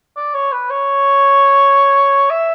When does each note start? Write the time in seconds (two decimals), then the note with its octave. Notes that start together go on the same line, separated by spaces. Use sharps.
0.16 D5
0.34 C#5
0.52 B4
0.70 C#5
2.30 E5